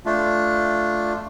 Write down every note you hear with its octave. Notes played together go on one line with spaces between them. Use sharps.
A3 D4 F4